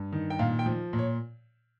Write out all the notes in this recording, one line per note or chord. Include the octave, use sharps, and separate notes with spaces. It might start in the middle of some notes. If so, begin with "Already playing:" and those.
Already playing: G2
D#3
G5
A#2 F5
G5
F3
A#2
C#5